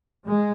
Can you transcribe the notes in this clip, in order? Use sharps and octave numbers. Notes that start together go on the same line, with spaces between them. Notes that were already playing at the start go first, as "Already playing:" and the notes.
G#3